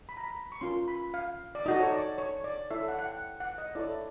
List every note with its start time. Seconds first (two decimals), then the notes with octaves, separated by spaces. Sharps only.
0.09 B5
0.17 A#5
0.24 B5
0.52 C#6
0.61 C#4 F4 A#4 C6
0.88 B5
1.14 F5
1.55 D5
1.66 D#4 F#4 A4 D#5
1.80 C#5
1.92 D5
2.18 C#5
2.44 D5
2.70 E4 A4 C#5 E5
2.88 F#5
2.99 F#5
3.06 G5
3.40 F#5
3.58 D#5
3.75 E4 A4 C#5 D5